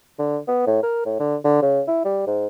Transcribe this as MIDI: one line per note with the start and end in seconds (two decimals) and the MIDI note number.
0.19 0.38 50
0.48 0.65 59
0.67 0.80 45
0.83 1.04 70
1.06 1.15 45
1.19 1.36 50
1.45 1.61 50
1.62 1.81 49
1.88 2.01 64
2.05 2.26 55
2.27 2.47 44